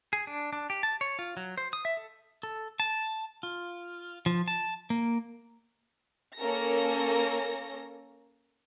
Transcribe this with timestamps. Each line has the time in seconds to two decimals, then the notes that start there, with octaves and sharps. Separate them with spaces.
0.13 G#4
0.27 D4
0.53 D4
0.70 G4
0.83 A5
1.01 C#5
1.19 F4
1.37 F#3
1.58 C5
1.73 D#6
1.85 E5
1.97 A4
2.43 A4
2.80 A5
3.43 F4
4.26 F3
4.48 A5
4.90 A#3
6.38 A#3 C#4 A4 A#4 A#6